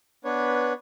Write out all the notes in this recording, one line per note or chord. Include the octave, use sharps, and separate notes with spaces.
B3 D4 B4 C#5